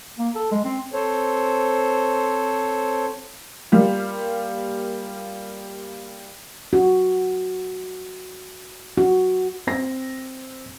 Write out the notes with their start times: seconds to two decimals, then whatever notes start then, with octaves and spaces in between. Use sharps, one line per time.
0.18 A#3
0.35 A4
0.51 G#3
0.64 C4
0.93 C4 A4 C5 C#5
3.72 G3 A#3 F4
6.73 F#4
8.98 F#4
9.67 C4 A#6